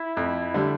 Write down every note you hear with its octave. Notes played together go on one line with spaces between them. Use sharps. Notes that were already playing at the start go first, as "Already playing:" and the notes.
Already playing: E4
F2
D3 G3